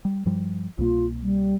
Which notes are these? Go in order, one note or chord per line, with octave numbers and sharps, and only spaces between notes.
G3
G2 F3 G3
C2 B2 A#3 F4
G3